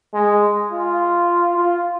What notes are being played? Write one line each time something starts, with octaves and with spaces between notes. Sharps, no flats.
G#3
F4
F4